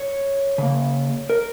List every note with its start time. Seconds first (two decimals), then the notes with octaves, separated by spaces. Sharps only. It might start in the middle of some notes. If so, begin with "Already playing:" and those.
Already playing: C#5
0.58 C#3 A#3
1.30 A#4